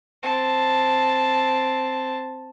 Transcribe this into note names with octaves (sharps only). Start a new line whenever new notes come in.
C4 A5